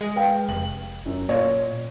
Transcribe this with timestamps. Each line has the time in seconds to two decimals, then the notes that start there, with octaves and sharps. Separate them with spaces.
0.01 G#3
0.16 B4 F5 G5
0.49 F1 F#7
1.06 F#2
1.29 A#2 C#5 F5